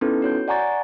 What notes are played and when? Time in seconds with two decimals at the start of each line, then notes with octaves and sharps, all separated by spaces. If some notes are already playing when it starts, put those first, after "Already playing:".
0.01 B3 C#4 D#4 E4 A4 B4
0.22 F#4 C#5 G6
0.48 D5 F#5 G#5 A#5 C#6 A6